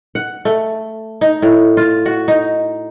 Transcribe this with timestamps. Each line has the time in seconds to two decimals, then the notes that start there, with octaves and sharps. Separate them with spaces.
0.15 F#5
0.45 A3
1.21 D#4
1.42 A2
1.77 F4
2.06 F#4
2.28 D#4